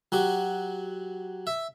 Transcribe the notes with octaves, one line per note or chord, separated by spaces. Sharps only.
F#3 F#4 G4
E5